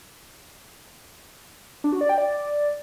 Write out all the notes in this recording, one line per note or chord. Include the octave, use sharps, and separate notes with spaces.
D4
F#4
D5
G5
D5